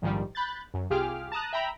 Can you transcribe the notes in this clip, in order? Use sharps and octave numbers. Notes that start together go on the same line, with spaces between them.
A#1 G#2 D#3 F3 G3
B5 F#6 G6 A6
F#2
C2 F4 G4 G#4 D6 F6
A5 A#5 D#6 F#6
E5 G5 A#5 B5